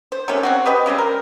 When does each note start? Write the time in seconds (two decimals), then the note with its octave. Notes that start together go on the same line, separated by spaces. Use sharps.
0.12 C5
0.28 C3 D#3 A3 C#4
0.43 C#3 C4 F#4
0.66 G4 B4 D#5 G5
0.86 C#3 G3 G#3 C4
0.98 A#4